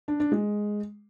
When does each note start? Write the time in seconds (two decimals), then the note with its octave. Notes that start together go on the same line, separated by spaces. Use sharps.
0.08 D4
0.20 D4
0.32 G#3